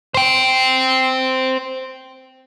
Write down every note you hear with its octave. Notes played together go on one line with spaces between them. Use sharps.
C5 G5